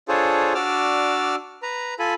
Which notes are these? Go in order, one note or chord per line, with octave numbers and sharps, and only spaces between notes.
D4 F4 G#4 A4 C5 C#5
D4 F#4 D5 D6 E6 F6
B4 A#5
F4 A4 G#5 B5